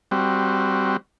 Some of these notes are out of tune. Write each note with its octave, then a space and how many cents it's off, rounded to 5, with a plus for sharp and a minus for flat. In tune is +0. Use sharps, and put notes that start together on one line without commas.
G3 +0 C4 +0 F#4 +0